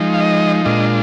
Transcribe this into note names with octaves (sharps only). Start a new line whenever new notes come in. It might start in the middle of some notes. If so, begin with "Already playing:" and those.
Already playing: F3 G#3 D#4
F5
D#5
A#2 G#3 D4 F4 D#5